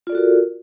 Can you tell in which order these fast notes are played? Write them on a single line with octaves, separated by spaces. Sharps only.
F4 D5 A4 F#4 A#4